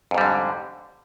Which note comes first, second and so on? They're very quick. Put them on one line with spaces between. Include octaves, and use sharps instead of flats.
F2 G#2 G3 D3